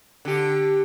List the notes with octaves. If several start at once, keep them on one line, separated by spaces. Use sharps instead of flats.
D3 G4